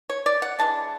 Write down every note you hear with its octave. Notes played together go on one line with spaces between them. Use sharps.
C#5
D5
F#5
E3 G#3 D4 A5